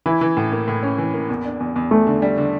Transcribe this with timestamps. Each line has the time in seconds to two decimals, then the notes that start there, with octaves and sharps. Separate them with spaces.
0.06 E3 E4
0.21 E3
0.37 A2
0.52 A#3
0.68 A2
0.83 C#4
0.98 E3
1.14 A#3
1.29 E2
1.45 D4
1.60 E2
1.76 E2
1.91 E2 A3
2.07 D3
2.22 G3
2.38 D3